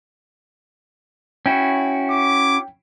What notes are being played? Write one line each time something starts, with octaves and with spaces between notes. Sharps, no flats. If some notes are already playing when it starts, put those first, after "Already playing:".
C#4 E4 F#4 G5
D6